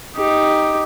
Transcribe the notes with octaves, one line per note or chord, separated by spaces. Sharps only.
D#4 G4